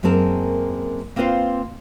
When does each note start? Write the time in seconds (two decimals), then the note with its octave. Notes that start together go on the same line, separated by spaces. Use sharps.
0.03 F#2 G#3 A#3 C4 A#4 A5
1.16 A#3 C4 F4 B4 C5 F5